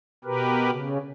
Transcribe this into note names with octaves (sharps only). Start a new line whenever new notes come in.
B2 G4 A#4 B4
C#3